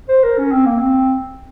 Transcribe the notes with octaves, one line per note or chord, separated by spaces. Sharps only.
C5
A#4
C#4
C4
A#3
C4